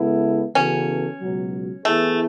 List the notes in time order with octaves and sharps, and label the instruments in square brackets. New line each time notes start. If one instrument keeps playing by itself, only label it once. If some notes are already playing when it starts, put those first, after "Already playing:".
Already playing: [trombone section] C#3 G#3 B3 E4 A4
[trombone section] C#3 E3 B3 F#4 A4 [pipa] C#4
[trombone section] C#2 B2 F#3
[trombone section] E3 B3 E4 G#4 [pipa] A3